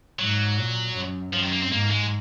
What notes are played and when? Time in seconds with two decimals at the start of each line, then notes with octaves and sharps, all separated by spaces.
0.19 G#2 F#3
0.57 A#2
0.95 F#2
1.33 F#2 F3
1.43 D#3
1.52 A#3
1.62 C4
1.72 G#2 A#3
1.91 G#3